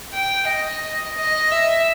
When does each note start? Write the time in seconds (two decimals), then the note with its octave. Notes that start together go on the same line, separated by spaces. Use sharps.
0.13 G5
0.47 D#5
1.17 D#5
1.52 E5